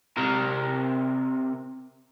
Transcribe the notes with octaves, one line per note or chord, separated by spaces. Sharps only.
C3 A#4